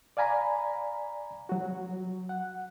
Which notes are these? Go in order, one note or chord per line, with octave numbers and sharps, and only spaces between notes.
D5 F5 G#5 A#5 B5
F#3 F#4
F#5